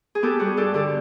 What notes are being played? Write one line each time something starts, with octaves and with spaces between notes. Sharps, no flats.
G#4
B3 G4 A4
G3 F#4 G#4
G2 G4 A4
D3 G4 A4